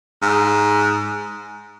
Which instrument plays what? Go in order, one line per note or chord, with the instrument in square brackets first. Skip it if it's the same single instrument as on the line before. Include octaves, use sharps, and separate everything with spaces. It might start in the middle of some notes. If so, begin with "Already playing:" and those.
[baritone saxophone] G#2